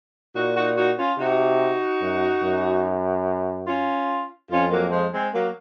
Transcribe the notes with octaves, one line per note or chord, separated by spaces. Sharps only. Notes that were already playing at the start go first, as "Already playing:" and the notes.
A#2 D#4 F#4
D#4 F#4
D#4 F#4
C#4 F4
C3 D#4 F#4
F#2
F#2
C#4 F4
F2 C#4 F4
F#3 A#3
F3 G#3
G#3 C4
F#3 A#3